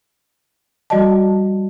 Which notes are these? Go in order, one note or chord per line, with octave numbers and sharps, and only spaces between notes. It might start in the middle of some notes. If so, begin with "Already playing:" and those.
F3 G3 F#4 D5 D#5 A5